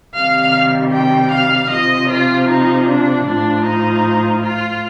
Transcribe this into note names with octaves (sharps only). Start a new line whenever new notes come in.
C3 D#3 G3 F5
G5
F5
C3 F3 D#5
F4
D#4
D4
A2 F3 D4
D#4
F4